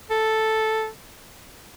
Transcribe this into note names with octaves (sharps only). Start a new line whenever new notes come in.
A4